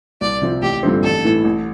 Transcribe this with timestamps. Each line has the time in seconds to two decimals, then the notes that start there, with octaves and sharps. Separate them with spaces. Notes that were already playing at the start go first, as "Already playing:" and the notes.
0.21 C2 D5
0.42 C3 F3 C4
0.62 A1 G4
0.83 G2 D3 F3 C4
1.03 A1 A4
1.25 A2 E3
1.44 A1